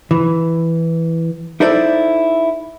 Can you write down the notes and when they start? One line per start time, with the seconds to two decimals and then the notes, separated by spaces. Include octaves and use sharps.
0.11 E3
1.60 D#4 E4 A4 C5 D5